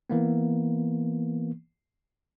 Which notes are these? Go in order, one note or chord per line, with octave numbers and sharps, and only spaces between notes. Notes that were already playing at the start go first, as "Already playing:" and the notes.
E3 A#3 B3